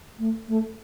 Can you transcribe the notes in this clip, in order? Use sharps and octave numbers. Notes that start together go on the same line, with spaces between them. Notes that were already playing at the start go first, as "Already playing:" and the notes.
A3
A3